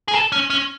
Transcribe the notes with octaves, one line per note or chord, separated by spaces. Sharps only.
G#4
A4
C#4
C#4